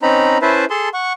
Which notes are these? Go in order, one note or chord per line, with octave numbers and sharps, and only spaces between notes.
C4 C#4 D#4 A#5 B5
C#4 E4 B4 C5 E5 A5
G#4 A4 A5 C6
F#5 C#6